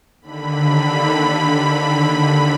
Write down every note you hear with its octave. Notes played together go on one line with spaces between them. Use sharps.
D#2 D3 B5